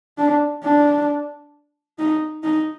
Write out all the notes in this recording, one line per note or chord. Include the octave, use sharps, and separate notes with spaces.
D4
D4
D#4
D#4